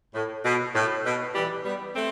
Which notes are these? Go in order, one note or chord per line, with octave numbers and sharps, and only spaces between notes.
A2
B2
A2
B2
E3 G3
G3 B3
A3 C4